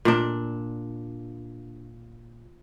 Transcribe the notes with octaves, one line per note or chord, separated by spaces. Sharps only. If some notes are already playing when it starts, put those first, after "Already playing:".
A#2 D4